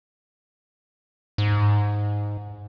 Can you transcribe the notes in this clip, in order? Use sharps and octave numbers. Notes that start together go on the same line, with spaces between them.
G#2